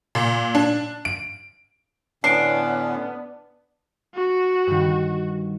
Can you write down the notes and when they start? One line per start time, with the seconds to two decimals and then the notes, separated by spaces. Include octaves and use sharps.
0.15 A#2
0.55 D4
1.05 D7
2.24 A2 D3 B3 C#4 D4 C7 D7
4.15 F#4
4.67 G2 D#3